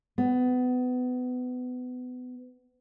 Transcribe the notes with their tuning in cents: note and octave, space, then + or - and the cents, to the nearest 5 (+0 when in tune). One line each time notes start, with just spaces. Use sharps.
B3 +25